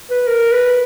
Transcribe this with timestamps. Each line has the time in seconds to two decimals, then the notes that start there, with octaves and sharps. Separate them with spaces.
0.10 B4
0.27 A#4
0.52 B4